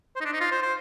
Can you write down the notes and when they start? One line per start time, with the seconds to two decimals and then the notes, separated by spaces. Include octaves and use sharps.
0.16 C5
0.21 D#4
0.25 D4
0.33 D#4
0.40 F4
0.52 C5
0.62 C5